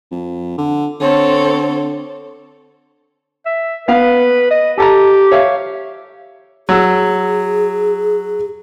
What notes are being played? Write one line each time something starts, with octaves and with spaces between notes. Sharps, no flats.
F2
D3
D3 C4 A4 C#5
E5
B3 B4 F5
D#5
G4 A4 A5 A#5
C#5 E5 F5
F#3 G#4 E6